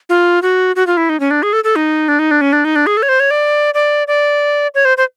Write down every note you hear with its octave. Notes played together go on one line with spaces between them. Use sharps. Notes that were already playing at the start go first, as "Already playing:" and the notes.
F4
F#4
F#4
F4
E4
D#4
C#4
D4
G#4
A4
A4
D#4
D4
D#4
D4
C#4
D4
D#4
D4
G#4
A4
C#5
C5
C#5
D5
D5
D5
C#5
C5
C5